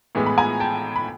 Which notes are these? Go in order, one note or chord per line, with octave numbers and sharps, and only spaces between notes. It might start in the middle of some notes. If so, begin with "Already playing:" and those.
A2 E3 G#3 B3
B5
G#5 A#5
G5 A5
B5